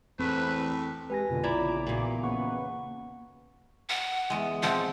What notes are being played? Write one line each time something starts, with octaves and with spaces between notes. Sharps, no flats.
E2 A2 C4 B4
G#3 G4 B4 G#5 A#6
F2 B2 D3 F4
A#1 E2 C#3 E4 D5 A#5 D6
E2 A#2 F#4
C#3 A#3 B4 F#5 C#6
F#5
E2 G#3
B2 F3 C4 F#5